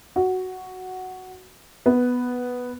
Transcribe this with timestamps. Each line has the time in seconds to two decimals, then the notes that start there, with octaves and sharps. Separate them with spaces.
0.16 F#4
1.86 B3